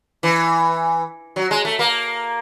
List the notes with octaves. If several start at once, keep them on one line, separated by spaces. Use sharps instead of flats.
E3
F#3
G#3
A3
A#3